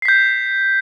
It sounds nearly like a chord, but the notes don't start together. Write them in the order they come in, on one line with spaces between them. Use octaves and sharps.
C7 B6 G6